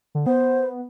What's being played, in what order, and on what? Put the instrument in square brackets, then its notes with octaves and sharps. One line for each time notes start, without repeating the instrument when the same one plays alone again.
[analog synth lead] D3
[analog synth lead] B3 [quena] C5